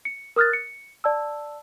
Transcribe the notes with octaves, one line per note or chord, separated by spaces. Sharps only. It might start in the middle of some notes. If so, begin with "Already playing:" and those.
C#7
A#4 D#6 F6 F#6 A6
C#7
D5 A5 E6